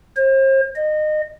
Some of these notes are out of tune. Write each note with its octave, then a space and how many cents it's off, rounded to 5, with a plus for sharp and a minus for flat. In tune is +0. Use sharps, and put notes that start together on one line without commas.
C5 +40
D#5 -25